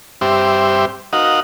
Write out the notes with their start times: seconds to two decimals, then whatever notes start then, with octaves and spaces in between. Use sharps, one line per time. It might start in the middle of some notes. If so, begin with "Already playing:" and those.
0.21 G2 C4 G4 C5 E5 D6
1.13 D#4 F#4 A#4 D#5 F5 F#5